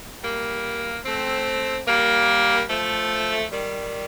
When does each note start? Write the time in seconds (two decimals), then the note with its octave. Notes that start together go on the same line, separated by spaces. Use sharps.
0.23 G3 A#3
1.05 A3 C4
1.88 G3 A#3
2.69 F3 A3
3.52 D#3 G3